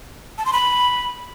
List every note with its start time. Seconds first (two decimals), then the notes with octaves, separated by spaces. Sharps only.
0.38 A5
0.45 C6
0.53 B5